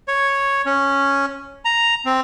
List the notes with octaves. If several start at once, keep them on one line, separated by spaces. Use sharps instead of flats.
C#5
C#4
A#5
C4